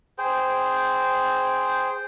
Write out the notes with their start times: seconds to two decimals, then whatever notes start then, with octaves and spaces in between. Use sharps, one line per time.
0.18 G#4 C5 G5